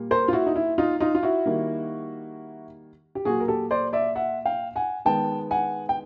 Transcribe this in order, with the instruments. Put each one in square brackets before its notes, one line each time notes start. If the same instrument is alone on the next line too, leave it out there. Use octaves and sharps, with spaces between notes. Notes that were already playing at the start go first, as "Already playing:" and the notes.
Already playing: [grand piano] A#2 G3 A#3
A#4 C5
F4
E4 F#4
D#4
E4
D#4 F4
D#4 F4
F4
E4 F#4
D#3 G3 A#3
G4
A#2 F#3 A#3 F#4 G#4
A#4
G4 A4
C5 D5
D5 E5
E5 F#5
F5 G5
F#5 G#5
D#3 G#3 B3 G5 A5
F#5 G#5
G5